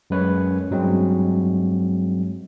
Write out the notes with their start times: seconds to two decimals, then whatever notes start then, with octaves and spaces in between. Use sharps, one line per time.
0.10 F#2 G#3 B4 C#5
0.71 G2 F#3 G#3 C4